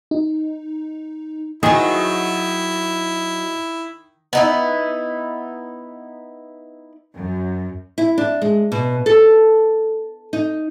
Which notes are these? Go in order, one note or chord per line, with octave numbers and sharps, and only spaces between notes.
D#4
D#3 F#3 E4 G#4 D#5
B3 D#4 E4
F#2
E4
D4
G#3
B2
A4
D#4